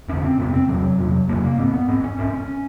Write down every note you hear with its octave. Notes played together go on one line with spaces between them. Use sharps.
F2 D3 C#4
C4
F2 C3 B3
C4
F2 C3 F#3
F2 C3
F2 C3 A#3
A#3
G#2 C4
B3
G#2 C4
C#4
G#2 C#4
C#4